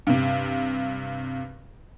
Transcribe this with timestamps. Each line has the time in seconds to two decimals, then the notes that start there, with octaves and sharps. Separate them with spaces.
0.07 G2 C3